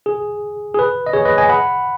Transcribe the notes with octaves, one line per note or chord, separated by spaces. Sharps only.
G#4
G#4
B4
D#5
G#4 C#5
B4 D#5
D#5 G#5
F#5 B5